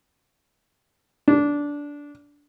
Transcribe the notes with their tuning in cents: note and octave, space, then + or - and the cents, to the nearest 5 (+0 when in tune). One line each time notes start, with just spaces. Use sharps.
D4 -15